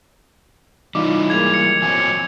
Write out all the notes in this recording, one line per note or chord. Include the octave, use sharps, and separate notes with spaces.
E3 G3 D#4 F4 D6
G#3 A#3 G#6 F7
C#7
F3 F#3 C4 G#5